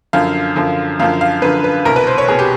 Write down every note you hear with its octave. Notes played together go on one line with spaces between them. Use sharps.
F#2 D3 F3 F5
F#2 D3 F3
F#2 D3 F3 F5
F5
F#2 D3 F3 B4
B4
C2 B2 A#4
B4
C5
C#5
C2 B2 G#4
G4